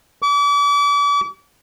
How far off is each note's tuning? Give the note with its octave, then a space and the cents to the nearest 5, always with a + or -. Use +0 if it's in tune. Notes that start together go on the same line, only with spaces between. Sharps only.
D6 -40